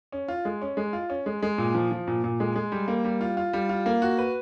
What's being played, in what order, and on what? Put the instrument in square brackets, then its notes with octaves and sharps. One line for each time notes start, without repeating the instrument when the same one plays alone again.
[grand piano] C#4
F4
G#3
C#4
G#3
F4
C#4
G#3
G#3
A#2
F3
F3
A#2
A#2
G#3
G#3
G3
A#3
G3
F4
F4
G3
F4
A#3
F#4
B4